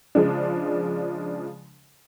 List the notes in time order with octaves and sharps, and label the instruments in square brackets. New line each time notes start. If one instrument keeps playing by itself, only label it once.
[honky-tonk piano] C#3 F3 G#3 D4